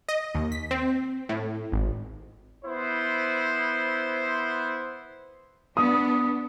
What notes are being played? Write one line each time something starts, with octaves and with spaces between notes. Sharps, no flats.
D#5
D#2
B6
C4
A2
G#1
B3 E4 C5
B3 D4 D#6